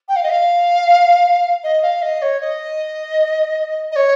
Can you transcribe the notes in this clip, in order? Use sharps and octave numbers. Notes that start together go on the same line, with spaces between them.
G5
F5
D#5
F5
D#5
F5
D#5
C#5
D#5
D#5
C#5